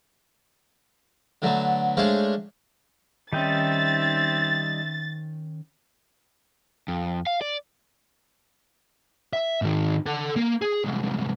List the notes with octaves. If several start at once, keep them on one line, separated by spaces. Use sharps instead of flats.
D3 F#3 A3 B3
G#3 A3 D4 C5 C#5 F5
D#3 G3 C4 C#4 D#4 E5 G5 A6
F2
F5
D5
E5
G#2 D#3
A4 F#5
A#3 A#5
G#4
C2 G#2